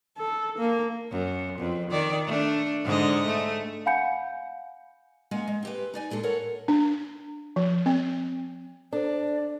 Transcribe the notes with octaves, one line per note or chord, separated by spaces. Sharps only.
A4
A#3
F#2
F2
D#3 D5
A3 D4
G#2 D3 D#5
A3
F5 F#5 G#5 B5 G6 C#7
G#3 A#3 C#4 F#4 F#5 G#5
G#3
C4 G4 B4
D#4 D5 G#5
A#2 G#3 D4 A4
A4 A#4 C#5 F#5
D4
F3
C4
D4 A4 C5 D5